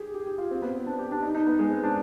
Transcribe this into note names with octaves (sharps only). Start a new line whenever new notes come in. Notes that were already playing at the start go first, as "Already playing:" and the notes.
Already playing: G4 G#4
G4
G4
F4
C4
B3
C4
D4
G4
D4
D#4
D#4
B3
G#3
C4
D4